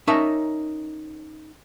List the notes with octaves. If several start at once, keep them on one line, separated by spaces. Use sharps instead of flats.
C#4 D#4 A#4 C#5 E5 A5